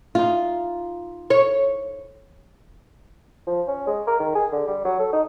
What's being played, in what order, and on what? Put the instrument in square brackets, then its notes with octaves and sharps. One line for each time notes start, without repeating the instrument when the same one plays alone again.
[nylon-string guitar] D#4 F4
[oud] C#5
[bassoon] F3
C#4
G#3
A#4
D#3
G#4
D3
G3
F#3
A4
D#4